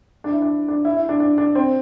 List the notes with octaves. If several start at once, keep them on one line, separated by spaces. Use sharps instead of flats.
D4
E4
D4
D4
E4
E4
D4
D4
D4
C4